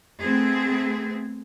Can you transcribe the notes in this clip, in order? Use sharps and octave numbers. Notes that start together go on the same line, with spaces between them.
A3 B3 C4 G#4